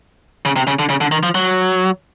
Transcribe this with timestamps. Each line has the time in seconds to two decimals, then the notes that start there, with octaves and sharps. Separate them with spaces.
0.45 C#3
0.56 C3
0.67 C#3
0.79 D3
0.90 C#3
1.01 D3
1.12 D#3
1.23 F3
1.35 F#3